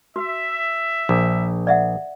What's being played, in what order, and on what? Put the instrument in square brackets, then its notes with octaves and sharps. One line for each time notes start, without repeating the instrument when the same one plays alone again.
[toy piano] F#4 [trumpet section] E5
[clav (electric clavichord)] A#1
[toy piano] D5 E5 F#5